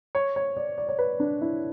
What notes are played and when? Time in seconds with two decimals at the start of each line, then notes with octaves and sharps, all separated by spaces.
0.15 C#5
0.36 C#5
0.57 D5
0.78 D5
0.89 C#5
0.99 B4
1.20 D4
1.41 E4